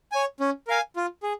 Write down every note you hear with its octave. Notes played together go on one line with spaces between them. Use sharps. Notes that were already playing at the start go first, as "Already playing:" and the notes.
C#5 G#5
C#4
A#4 F5 G#5
F4
G#4